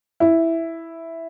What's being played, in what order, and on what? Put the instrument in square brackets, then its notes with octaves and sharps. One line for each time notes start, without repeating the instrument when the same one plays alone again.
[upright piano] E4